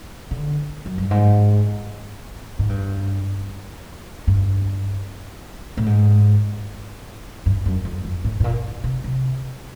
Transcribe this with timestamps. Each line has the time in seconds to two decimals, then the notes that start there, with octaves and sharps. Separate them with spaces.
0.31 D3
0.86 F#2
0.98 G2
1.11 G#2
2.59 G#2
2.69 G2
4.27 G2
5.77 A2
5.86 G#2
7.46 G2
7.66 F#2
7.85 F2
8.05 F2
8.24 A2
8.40 A2
8.44 A#2
8.84 C3
9.04 C3